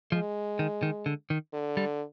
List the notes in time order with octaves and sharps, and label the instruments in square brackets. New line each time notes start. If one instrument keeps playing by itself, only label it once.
[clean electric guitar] F3 [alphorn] G#3
[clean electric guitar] D#3
D#3
D3
D#3
[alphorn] D3
[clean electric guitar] G3